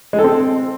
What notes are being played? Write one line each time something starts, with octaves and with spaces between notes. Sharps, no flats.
G#3
A4
C4